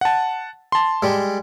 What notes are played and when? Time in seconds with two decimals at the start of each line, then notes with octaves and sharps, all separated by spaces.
0.01 F#5 A5
0.72 A5 C6
1.02 G3 G#3